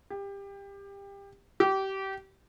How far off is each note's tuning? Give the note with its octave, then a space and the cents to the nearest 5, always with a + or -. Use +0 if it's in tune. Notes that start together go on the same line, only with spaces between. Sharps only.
G4 +25
G4 -25